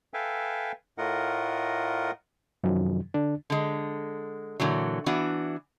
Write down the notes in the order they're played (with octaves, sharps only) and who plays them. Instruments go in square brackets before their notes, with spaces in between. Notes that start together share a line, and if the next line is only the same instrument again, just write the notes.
[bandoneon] A4 B4 E5 F5 G5 G#5
A2 A3 F4 A#4 D#5 F#5
[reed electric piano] F#2 C3 D#3 F3 F#3
D3 D4
[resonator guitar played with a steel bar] D3 G#3
A#2 D3 E3 F#3
E3 B3 D4 F#4